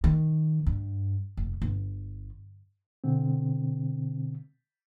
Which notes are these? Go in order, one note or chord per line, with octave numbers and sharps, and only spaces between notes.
D#3
G2
F1
G1
B2 D3 C4